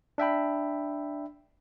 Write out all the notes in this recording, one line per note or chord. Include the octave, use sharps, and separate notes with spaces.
D4 E5 G5 B5